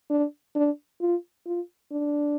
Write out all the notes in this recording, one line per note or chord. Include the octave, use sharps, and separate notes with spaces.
D4
D4
F4
F4
D4